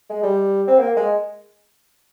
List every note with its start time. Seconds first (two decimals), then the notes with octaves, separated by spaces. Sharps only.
0.10 G#3
0.23 G3
0.67 C4
0.79 A#3
0.97 G#3